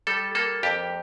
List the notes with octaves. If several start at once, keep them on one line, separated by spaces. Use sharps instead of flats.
G3 A4
A#3 A4
F2 G4